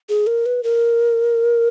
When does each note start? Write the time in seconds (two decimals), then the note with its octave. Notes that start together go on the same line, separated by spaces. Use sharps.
0.09 G#4
0.27 A#4
0.46 B4
0.63 A#4